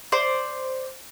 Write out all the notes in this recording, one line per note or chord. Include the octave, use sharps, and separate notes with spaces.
C5 D5